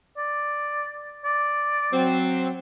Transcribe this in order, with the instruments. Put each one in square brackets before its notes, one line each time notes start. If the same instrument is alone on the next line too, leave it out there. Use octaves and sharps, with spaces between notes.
[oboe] D5
D5
[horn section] F#3 C4